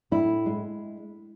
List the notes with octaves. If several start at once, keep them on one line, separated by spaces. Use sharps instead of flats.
A2 E4
G#3